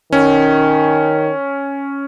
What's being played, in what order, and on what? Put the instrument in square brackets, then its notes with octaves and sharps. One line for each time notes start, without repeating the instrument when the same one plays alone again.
[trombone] D#3 [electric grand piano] C#4